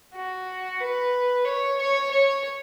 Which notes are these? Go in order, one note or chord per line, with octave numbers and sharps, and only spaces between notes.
F#4
B4
C#5
C#5
C#5